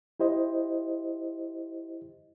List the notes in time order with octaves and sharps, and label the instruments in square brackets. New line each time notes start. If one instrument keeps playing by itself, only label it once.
[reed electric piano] E4 G4 C5 D#5